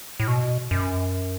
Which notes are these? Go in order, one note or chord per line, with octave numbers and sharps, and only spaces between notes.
A2
B2
F#2